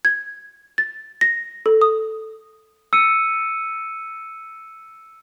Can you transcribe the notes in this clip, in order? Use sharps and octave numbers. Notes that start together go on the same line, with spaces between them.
G#6
A6
A#6
A4
D#6
E6 C#7 D#7